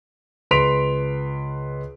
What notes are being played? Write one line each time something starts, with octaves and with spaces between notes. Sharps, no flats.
C#2 B4 C6 B6 D7 F7